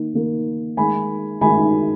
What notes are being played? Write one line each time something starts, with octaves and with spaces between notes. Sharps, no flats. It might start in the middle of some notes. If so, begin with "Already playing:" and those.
Already playing: D#3 A#3
D#3 A#3
D#3 G#3 G#5 B5
D#3 G#3 G#5 B5